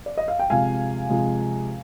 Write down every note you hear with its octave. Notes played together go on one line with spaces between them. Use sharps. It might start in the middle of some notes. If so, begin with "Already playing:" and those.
D5
D#5
F5
G5
C3 F3 G#3 F5 G#5
C3 F3 G#3